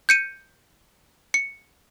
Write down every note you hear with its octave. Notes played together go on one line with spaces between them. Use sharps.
G6 C#7 D#7
C#7